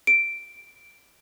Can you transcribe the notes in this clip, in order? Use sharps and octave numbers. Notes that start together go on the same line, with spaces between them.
D7